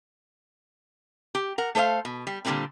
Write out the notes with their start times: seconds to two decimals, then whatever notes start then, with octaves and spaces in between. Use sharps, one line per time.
1.35 G4
1.58 A#4 F#5
1.75 A3 A4 C5 D#5 F5
2.05 B2
2.27 G3
2.45 A#2 D3 E3 G3 G#3 C4